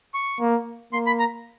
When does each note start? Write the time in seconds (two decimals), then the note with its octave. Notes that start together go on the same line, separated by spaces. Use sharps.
0.14 C#6
0.40 A#3
0.93 A#3 C6
1.06 B5
1.19 A#5